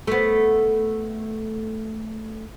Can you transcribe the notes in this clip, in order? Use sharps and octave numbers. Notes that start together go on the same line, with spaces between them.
A3 B3